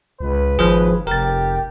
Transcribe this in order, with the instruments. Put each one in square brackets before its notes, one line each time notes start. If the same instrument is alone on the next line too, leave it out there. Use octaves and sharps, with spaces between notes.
[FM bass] C#2 [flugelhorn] B4
[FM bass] G#1 [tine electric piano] F3 G#4
[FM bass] F1 [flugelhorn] G4 [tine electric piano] A#4 A6